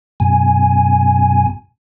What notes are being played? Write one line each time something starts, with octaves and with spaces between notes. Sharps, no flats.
F#2 B2 G#5